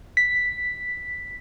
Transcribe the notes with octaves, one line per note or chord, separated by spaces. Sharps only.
B6